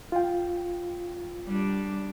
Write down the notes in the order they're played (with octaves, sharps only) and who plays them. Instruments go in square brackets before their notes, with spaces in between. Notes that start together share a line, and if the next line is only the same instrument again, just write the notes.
[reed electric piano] F4 G5
[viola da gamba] G3 D4